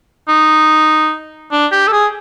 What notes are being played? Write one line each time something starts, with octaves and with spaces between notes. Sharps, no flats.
D#4
D4
G4
A4
G#4